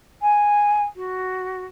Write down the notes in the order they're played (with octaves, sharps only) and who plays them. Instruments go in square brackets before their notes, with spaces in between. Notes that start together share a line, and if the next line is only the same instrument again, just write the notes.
[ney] G#5
F#4